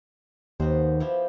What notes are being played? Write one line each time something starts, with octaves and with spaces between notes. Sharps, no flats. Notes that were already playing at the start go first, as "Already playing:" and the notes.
D#2 B3 F#4 C5
F3 E4 G4